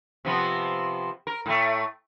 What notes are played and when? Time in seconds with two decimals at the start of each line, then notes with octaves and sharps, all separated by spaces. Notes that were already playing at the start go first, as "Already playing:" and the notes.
0.25 C3 F3 B3
1.27 A#4
1.46 A2 A3